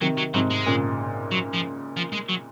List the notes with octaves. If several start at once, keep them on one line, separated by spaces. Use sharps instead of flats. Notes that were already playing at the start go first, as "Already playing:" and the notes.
C3 D#3 F#3
F#3
G#2 C3 F#3
G#3
A#2 C#3
F#3
F3
F3
G#3
F#3